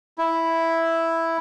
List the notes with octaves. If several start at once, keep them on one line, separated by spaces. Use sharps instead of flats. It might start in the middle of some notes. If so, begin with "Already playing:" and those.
E4